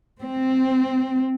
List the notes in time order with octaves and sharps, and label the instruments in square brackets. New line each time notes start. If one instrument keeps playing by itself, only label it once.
[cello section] C4